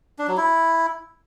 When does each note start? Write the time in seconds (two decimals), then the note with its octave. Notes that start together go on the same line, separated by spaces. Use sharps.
0.19 D4
0.28 F#3
0.37 E4